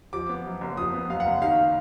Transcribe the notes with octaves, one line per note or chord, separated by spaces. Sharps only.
F3 D6
B3
F#2
F#1
F3 D#6
B3
F#2 F5
F#5
F#1
D#3 F5